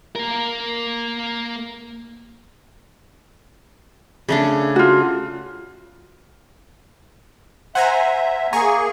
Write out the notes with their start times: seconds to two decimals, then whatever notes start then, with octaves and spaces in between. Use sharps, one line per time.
0.16 A#3 A#4
4.29 C#3 A3 D4
4.76 F4 F#4
7.75 C5 E5 F#5 G#5 A#5
8.53 A#3 G#4 G#5 A#5 C#6